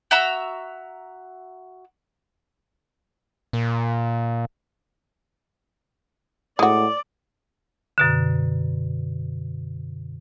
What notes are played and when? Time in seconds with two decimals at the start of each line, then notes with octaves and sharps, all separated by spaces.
0.11 F#4 E5 A#5 E6
3.53 A#2
6.59 A2 G#3 F#4 D5
7.98 F#2 B2 D3